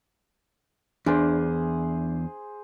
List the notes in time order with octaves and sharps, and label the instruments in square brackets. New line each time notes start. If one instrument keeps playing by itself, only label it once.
[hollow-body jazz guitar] E2 [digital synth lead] D4 [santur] G#4 C5